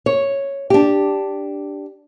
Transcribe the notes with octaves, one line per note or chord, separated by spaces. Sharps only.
C#5
D4 G4